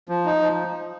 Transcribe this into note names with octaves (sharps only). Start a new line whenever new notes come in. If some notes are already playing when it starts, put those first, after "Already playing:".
F3
D#4
F3